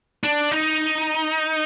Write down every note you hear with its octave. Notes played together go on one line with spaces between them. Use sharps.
D4
D#4